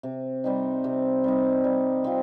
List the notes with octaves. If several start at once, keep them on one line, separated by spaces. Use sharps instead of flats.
C3
G3 C4 D#4
C3
G3 C4 D#4
G3
C4 F4